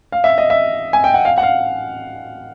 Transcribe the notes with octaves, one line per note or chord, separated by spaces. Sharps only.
F5
E5
D#5
E5
G#5
G5
F#5
F5
F#5
F5